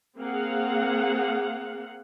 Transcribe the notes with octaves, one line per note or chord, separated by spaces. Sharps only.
A#3 C4 G#4 F5 F#5